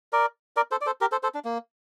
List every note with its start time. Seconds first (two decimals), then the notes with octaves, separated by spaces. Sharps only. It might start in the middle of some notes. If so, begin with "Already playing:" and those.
0.13 A#4 D5
0.56 A#4 D5
0.71 A4 C5
0.81 D5
0.86 A4 C5
1.01 G4 A#4
1.12 A4 C5
1.23 A4 C5
1.34 D4
1.45 A#3